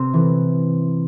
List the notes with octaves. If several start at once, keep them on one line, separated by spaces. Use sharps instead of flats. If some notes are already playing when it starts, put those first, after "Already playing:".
Already playing: C3 C4
E3